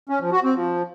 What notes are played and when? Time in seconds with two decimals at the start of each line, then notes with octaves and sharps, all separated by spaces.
0.09 C#4
0.21 F3
0.32 F#4
0.44 C4
0.55 F3